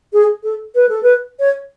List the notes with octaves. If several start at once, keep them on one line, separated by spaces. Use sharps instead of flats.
G#4
A4
B4
A4
B4
C#5